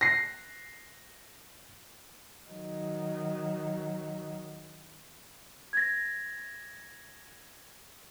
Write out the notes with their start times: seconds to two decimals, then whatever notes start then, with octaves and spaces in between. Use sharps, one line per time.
0.01 A#6 C7
2.47 D#3 F#3
5.73 G#6 A#6